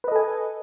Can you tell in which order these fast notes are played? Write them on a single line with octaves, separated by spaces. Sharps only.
B4 D#5 A4 G#5